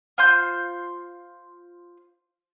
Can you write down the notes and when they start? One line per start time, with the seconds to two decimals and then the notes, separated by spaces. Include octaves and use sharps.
0.18 F4 C5 C6 G6